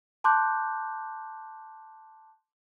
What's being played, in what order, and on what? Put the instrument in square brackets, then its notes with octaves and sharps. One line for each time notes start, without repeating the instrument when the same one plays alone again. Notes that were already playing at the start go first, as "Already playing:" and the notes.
[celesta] A5 C6 D6 F#6 G6